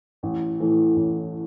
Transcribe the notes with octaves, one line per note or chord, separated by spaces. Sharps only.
A1
A2 E3 A3
A1